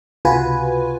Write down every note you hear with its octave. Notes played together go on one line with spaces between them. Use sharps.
C#2 C3 F4 F#4 B4 G#5